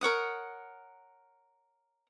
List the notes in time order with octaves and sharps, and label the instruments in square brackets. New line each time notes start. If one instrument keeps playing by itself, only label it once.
[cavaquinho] A#4 C#5 F#5 D#6